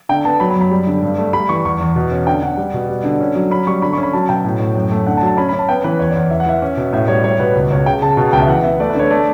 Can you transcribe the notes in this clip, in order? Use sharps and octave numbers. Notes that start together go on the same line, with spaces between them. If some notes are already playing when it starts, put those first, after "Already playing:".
D3 G5
B3 A5
F#3 B5
B5
F#2
B5
G3
D3
G2
A3
G3 B5
E3 C#6
E2 C#6
E2
B2
C#4
D3 G5
D3 F#5
G3
B2
G3
D3
C#4
F#3
C#4 B5
G3 C#6
D3 B5
C#4 C#6
B5
F#3 A5
B2 G5
A2
A2
F#2
A3
D3 F#5
A5
F#3
A5
C#4 B5
C#4 B5
A5
B3 G5
E3 B4
E2 C#5
E2 D5
E3 E5
F#5
E3 E5
C#4
B2
A2 E5
G3 C#5
G3 C#5
B2 B4
C#2
C#2 C#5
C#3 G5
C#3 A5
B2 A5
A5
C#2 G5
E5
E3 F#5
B3 E5
A3 D5
B4
D3 C#5
A3 D5